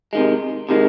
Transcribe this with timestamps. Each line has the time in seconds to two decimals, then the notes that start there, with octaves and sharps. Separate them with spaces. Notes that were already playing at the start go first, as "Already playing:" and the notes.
0.13 C3 D#3 G#3
0.69 C3 D#3 G#3